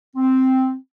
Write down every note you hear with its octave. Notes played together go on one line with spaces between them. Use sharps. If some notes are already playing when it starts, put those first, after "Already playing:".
C4